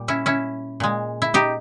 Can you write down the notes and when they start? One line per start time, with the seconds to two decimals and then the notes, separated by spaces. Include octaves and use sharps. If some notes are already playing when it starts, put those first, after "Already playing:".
Already playing: A#2 G3
0.08 C#4 E4
0.26 C#4 E4
0.80 A#2 G#3
1.22 E4
1.34 D#4 G4